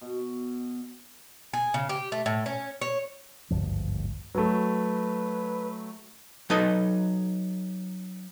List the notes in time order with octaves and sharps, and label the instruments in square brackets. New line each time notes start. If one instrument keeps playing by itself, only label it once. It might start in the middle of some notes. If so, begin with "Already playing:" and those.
[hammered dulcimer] B2
[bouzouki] G#4
C#3
G4
A3
A2
C#4
C#5
[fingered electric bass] G#1 D2 G2 F3
[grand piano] F#3 A3 [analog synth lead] B4
[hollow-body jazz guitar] F#3 D#4 A4 B4 D#5